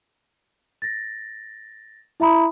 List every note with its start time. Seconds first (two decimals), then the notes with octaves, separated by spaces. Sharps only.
0.82 A6 A#6
2.20 E4 E5 A#5 B5 D#6